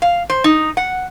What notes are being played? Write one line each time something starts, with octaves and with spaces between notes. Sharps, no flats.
F5
C5
D#4
F#5